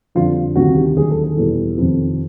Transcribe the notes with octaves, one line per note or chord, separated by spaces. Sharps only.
F2 D3 G3 F4
D2 C3 D#3 G3 F#4
G4
D#2 D3 F#3 G#4
A4
A4
E2 B2 G3
F2 C3 D#3